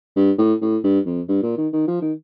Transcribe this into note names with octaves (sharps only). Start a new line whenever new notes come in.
G2
A2
A2
G2
F2
G2
A#2
D#3
D#3
F3
D#3